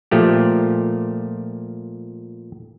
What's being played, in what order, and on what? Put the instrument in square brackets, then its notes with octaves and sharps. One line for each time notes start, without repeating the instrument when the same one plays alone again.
[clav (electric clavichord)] A#2 F3 A3 G4